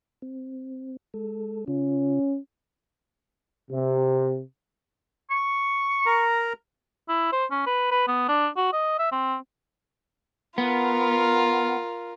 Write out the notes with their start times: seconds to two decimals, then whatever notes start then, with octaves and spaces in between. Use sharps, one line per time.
0.22 C4
1.14 G#3 A4
1.68 C#3 C#4 F4
3.71 C3
5.30 C#6
6.06 A#4 A#5
7.09 E4
7.32 C5
7.51 C#4
7.66 B4
7.91 B4
8.08 B3
8.29 D4
8.56 F#4
8.73 D#5
8.99 E5
9.12 C4
10.58 B3 F4 A#4